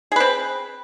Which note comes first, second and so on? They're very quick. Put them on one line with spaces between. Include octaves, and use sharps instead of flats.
G#4 B4 C4